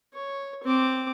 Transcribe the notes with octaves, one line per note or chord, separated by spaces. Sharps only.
C#5
C4 D6